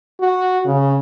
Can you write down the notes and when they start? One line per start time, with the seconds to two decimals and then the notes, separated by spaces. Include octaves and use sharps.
0.21 F#4
0.66 C#3